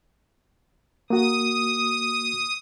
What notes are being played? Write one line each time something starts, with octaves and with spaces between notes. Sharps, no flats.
A#3 F#4 D#6